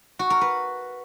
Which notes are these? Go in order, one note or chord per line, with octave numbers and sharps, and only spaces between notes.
F#4
A#4
B4